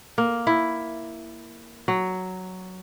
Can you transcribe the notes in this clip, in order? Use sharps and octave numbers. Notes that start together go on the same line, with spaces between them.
A#3
E4
F#3